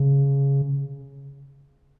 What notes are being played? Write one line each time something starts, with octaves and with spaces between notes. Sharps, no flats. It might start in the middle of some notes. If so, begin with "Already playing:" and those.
Already playing: C#3